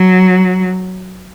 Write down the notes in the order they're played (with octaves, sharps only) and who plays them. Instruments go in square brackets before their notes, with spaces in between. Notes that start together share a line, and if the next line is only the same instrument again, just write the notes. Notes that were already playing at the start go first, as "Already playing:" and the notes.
Already playing: [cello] F#3